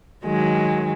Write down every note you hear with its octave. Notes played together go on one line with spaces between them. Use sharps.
D#3 F#3 G#3